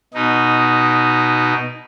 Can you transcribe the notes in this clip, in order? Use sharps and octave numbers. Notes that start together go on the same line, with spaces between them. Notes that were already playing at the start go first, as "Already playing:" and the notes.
B2 D#4